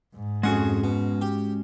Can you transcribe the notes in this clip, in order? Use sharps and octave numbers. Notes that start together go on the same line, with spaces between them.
G#2
F2 G#3 C#4 F#4 G#4 F#5
B2
G4